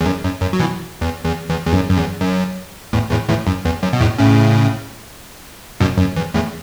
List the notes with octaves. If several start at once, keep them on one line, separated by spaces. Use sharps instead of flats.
E2
F#2
F#2
F#2
F#3
B2 E3
E2
E2
E2
E2
F#2
F#2
E2
F#2
E2 A2
E2 A2
E2 A2
F#2
E2
F#2
B2
E2 A2
A2 C#3
F#2 B2
F#2
E2
E2 A2